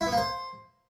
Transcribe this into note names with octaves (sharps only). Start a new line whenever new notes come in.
E4
B3
A#3
C5